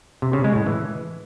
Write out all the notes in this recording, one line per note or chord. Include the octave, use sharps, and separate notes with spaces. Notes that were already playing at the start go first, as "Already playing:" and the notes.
C3
C#3
G#3
A2
E3